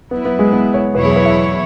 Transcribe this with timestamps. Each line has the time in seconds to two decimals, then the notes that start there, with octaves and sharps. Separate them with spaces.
0.11 F#3 B3 E4 B4
0.25 B3
0.39 G#3
0.53 B3
0.74 C#5
0.94 E2 B2 F#3 E4 B4 C#5
1.05 G#4
1.16 B4
1.25 E5